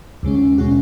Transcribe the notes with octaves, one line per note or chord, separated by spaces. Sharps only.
D#2 C#3 G#3 C#4
B2 G#3 C#4 F#4